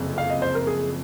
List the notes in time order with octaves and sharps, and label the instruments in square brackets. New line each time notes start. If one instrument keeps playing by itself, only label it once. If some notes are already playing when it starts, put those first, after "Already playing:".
Already playing: [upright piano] F#1 F2 C3
[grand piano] F5
D#5
C5
A#4
G#4